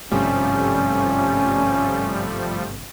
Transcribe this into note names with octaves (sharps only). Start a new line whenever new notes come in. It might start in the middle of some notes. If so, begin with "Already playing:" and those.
G#1 G2 C3 F3 G3 A3 C#4